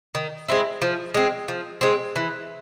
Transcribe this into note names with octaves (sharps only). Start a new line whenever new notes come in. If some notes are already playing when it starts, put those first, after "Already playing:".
D#3
G#3 C4 E4
F3
G#3 C4
F3
G#3 C4
E3